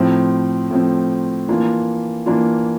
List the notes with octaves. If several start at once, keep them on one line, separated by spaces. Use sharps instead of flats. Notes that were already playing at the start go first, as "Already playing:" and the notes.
Already playing: A2 F3 C4
A2 F3 C4
E3 A#3 D4 F4
E3 A#3 D4 F4